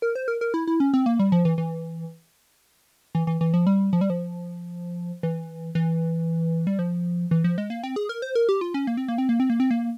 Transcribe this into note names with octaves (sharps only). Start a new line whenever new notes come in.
A#4
C5
A#4
A#4
E4
E4
C#4
C4
A#3
G3
F3
E3
E3
E3
E3
E3
F3
G3
F3
G3
F3
E3
E3
G3
F3
E3
F3
G#3
A#3
C4
G#4
A#4
C5
A#4
G4
F4
C#4
A#3
C4
A#3
C4
A#3
C4
A#3
C4
A#3